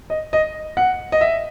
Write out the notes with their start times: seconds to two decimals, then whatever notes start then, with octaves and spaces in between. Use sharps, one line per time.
0.10 D#5
0.33 D#5
0.77 F#5
1.12 D#5
1.21 E5